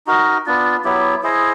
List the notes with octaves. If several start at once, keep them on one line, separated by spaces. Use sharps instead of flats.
D#4 F#4 A#4 D#5
B3 D4 F4
F#3 B3 E4 G4
E4 G#4 C5 D#5